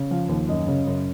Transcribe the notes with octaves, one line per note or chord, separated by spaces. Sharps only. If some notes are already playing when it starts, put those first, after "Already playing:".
Already playing: C#3
F3 F5
D#2
F#2 D#5
C#3
F#2